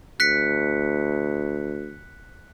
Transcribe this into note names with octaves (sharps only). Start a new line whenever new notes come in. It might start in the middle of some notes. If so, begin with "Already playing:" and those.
D2 F#6 B6 C#7